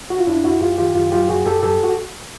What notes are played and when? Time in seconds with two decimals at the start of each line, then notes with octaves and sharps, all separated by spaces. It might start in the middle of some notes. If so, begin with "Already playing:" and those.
0.10 F#4
0.19 F4
0.27 F#2 D4 E4
0.44 F#2 E4 F#4
0.61 F#2 F4 G4
0.78 D#3 F4 G4
0.95 F#2 F4 G4
1.12 F#3 F4 G4
1.29 F#2 F#4 G#4
1.45 F#2 G4 A4
1.62 F#2 G4 A4
1.83 F#4